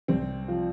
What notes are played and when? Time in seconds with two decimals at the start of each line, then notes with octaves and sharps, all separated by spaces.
0.08 C2 C4
0.48 F3